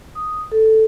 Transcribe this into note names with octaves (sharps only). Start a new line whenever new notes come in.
D#6
A4